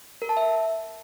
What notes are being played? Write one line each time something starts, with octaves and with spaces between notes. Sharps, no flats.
A#4
A5
E5